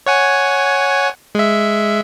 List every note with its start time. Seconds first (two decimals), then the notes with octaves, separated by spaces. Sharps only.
0.06 C#5 F#5 G#5
1.35 G#3 E5